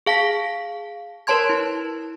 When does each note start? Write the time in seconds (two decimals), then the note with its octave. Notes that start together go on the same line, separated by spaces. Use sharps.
0.06 G#4 F5 A5 B6
1.27 A#4 B4 C#5 A5 C6 G#6
1.49 E4